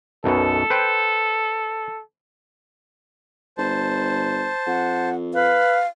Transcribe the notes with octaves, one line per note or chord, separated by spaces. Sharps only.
B1 F#2 B2 A4
B4 C5 G5
G1 C5 A5
F2 F#5
B4 F5